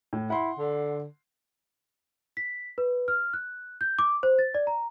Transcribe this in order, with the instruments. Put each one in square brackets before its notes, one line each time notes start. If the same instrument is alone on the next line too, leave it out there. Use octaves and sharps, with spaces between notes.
[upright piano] A2
[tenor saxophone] E4 [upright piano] F#5 C6
[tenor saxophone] D3
[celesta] B6
B4
F6
F#6
G6
D6
C5
A6
D5
A#5